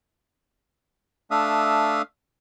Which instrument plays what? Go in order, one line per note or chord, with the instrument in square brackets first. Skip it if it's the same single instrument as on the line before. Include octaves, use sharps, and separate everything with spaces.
[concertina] A3 D4 E5 F5 D#6